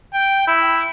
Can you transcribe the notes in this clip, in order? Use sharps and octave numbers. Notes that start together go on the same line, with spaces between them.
G5
E4